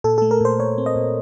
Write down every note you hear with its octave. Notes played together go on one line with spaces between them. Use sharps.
A#2 A4
A3 A4
A#4
A#2 C5
A#2 C#5
C4
D#5
A#2